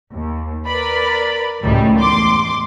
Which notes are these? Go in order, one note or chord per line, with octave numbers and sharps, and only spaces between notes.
D#2
A#4 B4 D5 B5
C#2 F#2 A2 D#3 G3
E2 C6 D6